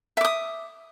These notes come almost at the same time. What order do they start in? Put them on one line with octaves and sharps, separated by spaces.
E5 D6 D#6